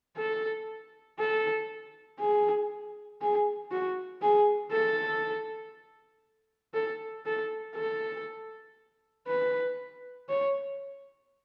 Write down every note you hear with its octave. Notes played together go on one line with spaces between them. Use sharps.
A4
A4
G#4
G#4
F#4
G#4
A4
A4
A4
A4
B4
C#5